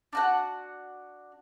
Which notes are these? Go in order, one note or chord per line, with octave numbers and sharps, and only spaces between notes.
D4 F#4 F#5